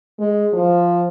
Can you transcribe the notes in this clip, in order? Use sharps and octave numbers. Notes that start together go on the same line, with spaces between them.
G#3
F3